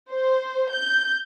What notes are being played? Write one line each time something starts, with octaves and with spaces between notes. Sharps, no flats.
C5
G6